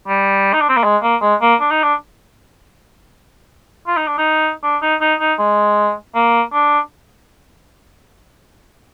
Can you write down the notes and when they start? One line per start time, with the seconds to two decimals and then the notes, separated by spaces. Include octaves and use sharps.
0.08 G3
0.53 D#4
0.61 D4
0.69 C4
0.76 A#3
0.84 G#3
1.03 A#3
1.22 G#3
1.42 A#3
1.61 D4
1.71 D#4
1.83 D4
3.87 F4
3.97 D#4
4.07 D4
4.18 D#4
4.64 D4
4.82 D#4
5.01 D#4
5.20 D#4
5.39 G#3
6.15 A#3
6.53 D4